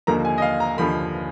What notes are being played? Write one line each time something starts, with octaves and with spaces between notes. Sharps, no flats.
D#2 D3 F3 A#3 A#5
G#5
D#5
F5
A#5
D#2 D3 F3 A#3 B5